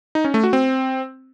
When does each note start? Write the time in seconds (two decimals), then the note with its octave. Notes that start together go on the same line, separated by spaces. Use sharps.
0.15 D#4
0.25 C#4
0.34 A3
0.43 F#4
0.53 C4